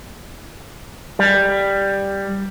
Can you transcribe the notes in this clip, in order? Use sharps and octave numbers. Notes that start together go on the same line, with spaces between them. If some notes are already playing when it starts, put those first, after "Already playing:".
G3